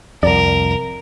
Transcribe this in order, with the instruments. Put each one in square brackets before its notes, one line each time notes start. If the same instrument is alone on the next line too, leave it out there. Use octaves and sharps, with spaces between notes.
[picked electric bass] C2 F2 [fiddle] A#4 [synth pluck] D5